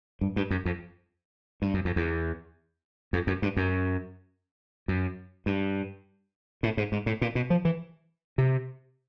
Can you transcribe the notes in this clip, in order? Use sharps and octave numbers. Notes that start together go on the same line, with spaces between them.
G2
G2
F#2
F2
G2
F#2
F2
E2
F2
F#2
G2
F#2
F#2
G2
A2
G#2
G#2
A2
A#2
B2
F3
E3
C3